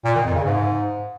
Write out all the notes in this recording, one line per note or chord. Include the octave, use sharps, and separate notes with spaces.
A#2
D#3
F2
C#3
G#2